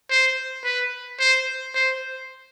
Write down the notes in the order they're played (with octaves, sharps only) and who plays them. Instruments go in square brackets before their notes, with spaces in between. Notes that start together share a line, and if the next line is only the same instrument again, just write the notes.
[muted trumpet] C5
B4
C5
C5